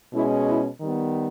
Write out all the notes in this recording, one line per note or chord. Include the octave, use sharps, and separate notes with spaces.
B2 G#3 C#4 E4
E4
D#3 G3 B3